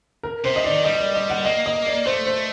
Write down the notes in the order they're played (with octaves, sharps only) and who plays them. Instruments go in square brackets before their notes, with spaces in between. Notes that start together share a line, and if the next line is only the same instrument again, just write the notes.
[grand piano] A#4
[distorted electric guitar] C3 [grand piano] C5
[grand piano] D#5
[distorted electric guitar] D#3 [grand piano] D5
[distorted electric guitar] G3 [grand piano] D#5
[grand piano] D5
D#5
F#5
[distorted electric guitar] A#3 [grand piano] D#5
[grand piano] D#5
D5
[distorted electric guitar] A3 [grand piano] C5
[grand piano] C5